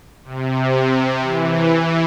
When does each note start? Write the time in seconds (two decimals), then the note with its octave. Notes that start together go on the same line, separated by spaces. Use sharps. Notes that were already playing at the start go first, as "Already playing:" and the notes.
0.24 C3
1.22 E3
1.71 E3